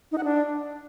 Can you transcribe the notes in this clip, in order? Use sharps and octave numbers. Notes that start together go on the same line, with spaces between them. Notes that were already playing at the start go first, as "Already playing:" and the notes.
D#4
F#5
D4